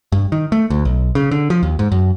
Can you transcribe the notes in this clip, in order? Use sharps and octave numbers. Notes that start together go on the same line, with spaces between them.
G2
D#3
A3
D2
B1
C#3
D3
F3
D#2
G#2
F#2